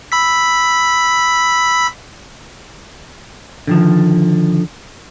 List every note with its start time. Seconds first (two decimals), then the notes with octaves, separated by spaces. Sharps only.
0.12 B5 E6 B6
3.67 D3 D#3 F3